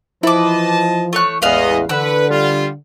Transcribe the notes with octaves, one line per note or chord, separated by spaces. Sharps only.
E3 F3 E4 B4 C5 D#5 A5 D6
A3 C#5 F#6
A1 E2 G#3 B3 B4 D#5 F5 F6
D3 B4 F#5 E6
G3 F4